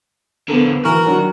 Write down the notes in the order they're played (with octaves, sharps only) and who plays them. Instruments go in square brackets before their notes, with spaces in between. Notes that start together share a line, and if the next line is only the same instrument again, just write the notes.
[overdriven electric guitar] D3 F3 [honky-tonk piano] B3 A4 A#4
[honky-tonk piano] E3 [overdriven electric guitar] F#4 [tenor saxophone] A#4
[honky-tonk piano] D#3 F#3 D4